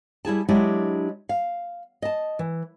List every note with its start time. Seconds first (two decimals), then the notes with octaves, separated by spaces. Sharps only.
0.25 G3 E4 G#4 A5
0.49 F#3 G#3 D4 E4 G4
1.29 F5
2.02 D#5 A5
2.39 E3